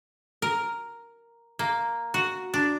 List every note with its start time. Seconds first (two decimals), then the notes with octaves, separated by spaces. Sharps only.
0.42 A#4
1.59 A#3
2.14 F#4
2.54 D4